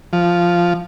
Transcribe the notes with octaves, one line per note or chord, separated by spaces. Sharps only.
F3